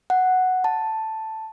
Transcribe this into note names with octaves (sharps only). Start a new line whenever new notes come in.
F#5
A5